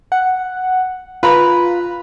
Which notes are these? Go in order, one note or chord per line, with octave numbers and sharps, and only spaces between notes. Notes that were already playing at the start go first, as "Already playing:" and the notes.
F#5
F4 B4 A#5 B5